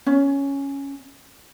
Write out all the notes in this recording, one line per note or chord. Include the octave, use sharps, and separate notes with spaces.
C#4